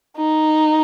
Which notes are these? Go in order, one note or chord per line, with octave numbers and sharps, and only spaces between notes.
D#4